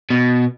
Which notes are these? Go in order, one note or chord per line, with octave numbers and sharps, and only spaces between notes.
B2